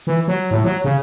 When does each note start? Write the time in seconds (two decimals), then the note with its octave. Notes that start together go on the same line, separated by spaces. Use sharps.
0.07 E3
0.28 F#3
0.51 A2
0.64 F#3
0.84 C#3